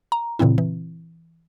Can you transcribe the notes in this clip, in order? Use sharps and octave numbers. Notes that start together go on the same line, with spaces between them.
A#5
A#2 C#3 E3 C4 E4
E3